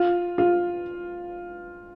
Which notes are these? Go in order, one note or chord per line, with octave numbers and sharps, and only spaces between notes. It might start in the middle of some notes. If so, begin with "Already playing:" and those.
Already playing: F4
F4